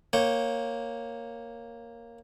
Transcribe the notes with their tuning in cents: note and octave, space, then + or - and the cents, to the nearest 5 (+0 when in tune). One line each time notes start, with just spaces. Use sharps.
A#3 +0 C#5 -10 G5 -5